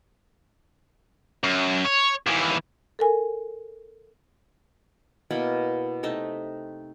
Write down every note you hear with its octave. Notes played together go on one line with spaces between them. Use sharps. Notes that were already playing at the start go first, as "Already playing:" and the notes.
F#2
C#5
D#2 E3
A4 A#4 G#5
B2 A#3 E4 B5
C3 A3 D#4 E5